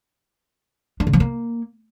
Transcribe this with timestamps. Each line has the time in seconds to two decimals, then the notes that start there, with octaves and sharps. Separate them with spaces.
1.00 D4
1.07 C#3
1.13 F3
1.20 A#3